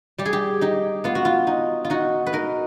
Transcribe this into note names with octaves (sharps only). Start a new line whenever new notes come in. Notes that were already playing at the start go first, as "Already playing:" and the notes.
G3 G4
G#4
G4
D#4 G4
B3 F4
F#4
F4
D#4
F4
D#4 F#4
B4
D#4 A#4